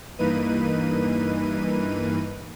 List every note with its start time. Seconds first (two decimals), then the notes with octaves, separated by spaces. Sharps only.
0.18 G2 E3 A#3 D#4 B4 D#7